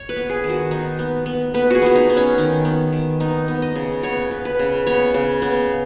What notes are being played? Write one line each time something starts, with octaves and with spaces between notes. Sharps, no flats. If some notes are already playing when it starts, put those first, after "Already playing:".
Already playing: C#5
B4
B3
G#4
D#3
F#4
B3 D#4
B3
B3
B3 B4
F#4 G#4
B3 F#4
D#4
B3
C#4
D#3
B3
D#3
B3 D#4
B3
D#5
C#3
B3 C#5
B3
B4
C#3
B3 C#5
C#3
B3